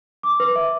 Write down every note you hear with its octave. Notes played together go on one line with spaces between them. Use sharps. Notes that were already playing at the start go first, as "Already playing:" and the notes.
D6
B4
E5